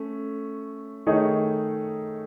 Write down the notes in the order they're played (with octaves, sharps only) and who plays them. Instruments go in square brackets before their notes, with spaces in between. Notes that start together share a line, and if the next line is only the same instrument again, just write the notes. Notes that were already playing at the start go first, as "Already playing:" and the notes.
Already playing: [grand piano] A3 C#4
D#3 A3 D#4 G#4 C#5